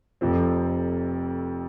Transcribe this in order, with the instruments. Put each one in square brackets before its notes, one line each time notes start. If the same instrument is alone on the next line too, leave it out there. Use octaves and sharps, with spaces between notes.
[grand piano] F1 F2 C3 F3 C4